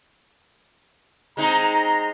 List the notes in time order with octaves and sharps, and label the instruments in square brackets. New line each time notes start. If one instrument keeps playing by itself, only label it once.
[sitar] G#3 C4 D#4 [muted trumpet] A#5